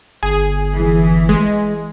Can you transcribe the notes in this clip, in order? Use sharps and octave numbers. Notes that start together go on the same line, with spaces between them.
G1 G#4
E3
G#3